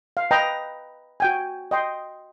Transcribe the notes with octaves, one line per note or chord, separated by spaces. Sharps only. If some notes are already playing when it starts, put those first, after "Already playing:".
F5
B4 D#5 G5 A#5
F#4 G5 G#5
D#5 G5 C6